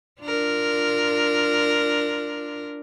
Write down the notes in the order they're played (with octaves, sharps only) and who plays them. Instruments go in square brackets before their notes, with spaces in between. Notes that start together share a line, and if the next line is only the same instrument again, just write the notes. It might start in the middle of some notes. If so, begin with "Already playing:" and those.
[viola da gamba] D4 F4 A#4